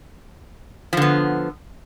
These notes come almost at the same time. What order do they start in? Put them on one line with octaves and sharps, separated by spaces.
F3 D3 B3